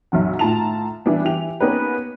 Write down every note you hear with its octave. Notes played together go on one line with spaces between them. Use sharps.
B1 F#2 F#3 F#5
A2 D#3 F4 A5 A#5 F7
E3 G3 B3 D4
E3 G4 F7
A#3 B3 C#4 D#4 G4 B4